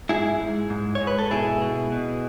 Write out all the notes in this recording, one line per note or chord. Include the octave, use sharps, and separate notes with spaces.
G#2 E4 G#4
G#2
G#2
C#5
G#2
B4
A4
B2 E4 G#4
B2
B2